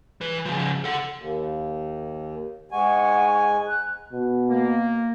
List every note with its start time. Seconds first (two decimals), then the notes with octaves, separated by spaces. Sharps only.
0.21 E3 B4
0.46 C#3 F3
0.84 A4 F#5
1.18 D#2
2.71 G#2 G#3 F#5 G#5 C#6
3.68 A#5 F#6
4.13 B2
4.50 A#3